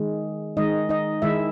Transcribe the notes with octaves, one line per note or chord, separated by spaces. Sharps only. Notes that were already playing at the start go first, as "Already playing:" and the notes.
Already playing: D#3 G#3
D#3 G#3 D#4 D#5
D#4 D#5
D#3 G#3 E4 E5